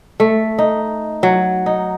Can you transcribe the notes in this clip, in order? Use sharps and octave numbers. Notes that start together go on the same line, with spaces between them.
A3
D#4
F#3
D#4